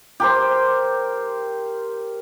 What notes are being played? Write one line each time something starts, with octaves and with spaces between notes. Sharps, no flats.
G4 A#4 C5